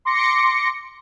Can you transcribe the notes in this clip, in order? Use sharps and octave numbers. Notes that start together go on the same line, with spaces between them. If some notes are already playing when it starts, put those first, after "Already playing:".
C6 D6 A#6 C#7